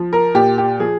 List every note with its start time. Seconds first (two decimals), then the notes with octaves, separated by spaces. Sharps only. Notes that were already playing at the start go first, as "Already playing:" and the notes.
Already playing: F3
0.13 A#4
0.35 A#2 G4
0.58 G4
0.80 F3 G#4